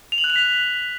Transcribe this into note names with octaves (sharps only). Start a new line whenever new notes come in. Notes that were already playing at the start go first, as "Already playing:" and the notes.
F7
F#7
F#6
F7
B6